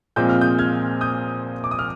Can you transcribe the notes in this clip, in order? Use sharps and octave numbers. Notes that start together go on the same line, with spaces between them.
A#2 F3 G#3 C4 G6
F6
D#6 G6
F6 G#6
D#6 G6
D6
D#6
F6